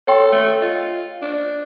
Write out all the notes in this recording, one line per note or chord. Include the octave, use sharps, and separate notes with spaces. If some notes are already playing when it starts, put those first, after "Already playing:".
A4 C#5 G5 C6
A3
F4 D#5
D4